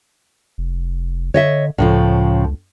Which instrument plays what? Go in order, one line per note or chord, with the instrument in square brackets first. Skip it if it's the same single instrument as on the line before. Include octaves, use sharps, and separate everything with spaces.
[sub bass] F1
[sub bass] D3 [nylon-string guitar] C#5 D#5 E5
[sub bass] C#2 [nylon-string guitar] A2 C#3 F3